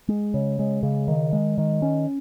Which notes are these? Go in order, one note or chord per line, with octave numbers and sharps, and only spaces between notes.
G#3
C#3
G#3
C#3
D#3
G#3
D#3
C#4